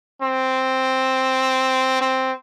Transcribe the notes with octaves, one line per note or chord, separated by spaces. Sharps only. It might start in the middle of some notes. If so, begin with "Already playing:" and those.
C4
C4